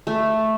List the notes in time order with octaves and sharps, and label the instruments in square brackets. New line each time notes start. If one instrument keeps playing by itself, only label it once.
[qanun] A3